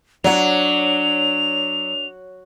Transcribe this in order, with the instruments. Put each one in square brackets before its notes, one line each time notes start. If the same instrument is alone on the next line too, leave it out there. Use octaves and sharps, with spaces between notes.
[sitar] F#3 [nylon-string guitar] D4 F#5 [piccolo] F7